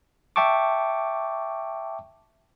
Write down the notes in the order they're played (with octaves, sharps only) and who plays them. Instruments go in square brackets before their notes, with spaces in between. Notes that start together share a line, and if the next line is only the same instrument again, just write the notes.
[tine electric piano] E5 G5 A5 C#6 D6